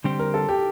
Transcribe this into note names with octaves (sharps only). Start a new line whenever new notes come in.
D3 G3 C4 G4 C5
A#4
A4
G4